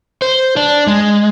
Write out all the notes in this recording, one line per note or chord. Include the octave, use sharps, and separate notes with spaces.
C5
D4
G#3